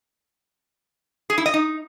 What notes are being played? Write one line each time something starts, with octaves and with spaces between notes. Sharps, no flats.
G#4
E4
D#5
D#4